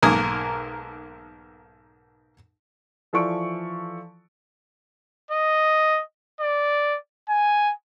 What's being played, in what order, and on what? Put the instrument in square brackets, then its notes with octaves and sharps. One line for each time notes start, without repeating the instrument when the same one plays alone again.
[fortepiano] B1 G#2 A#3 A#4 G#5 D#6
[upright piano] E3 F3 A4 D5 C#6 D7
[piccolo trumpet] D#5
D5
G#5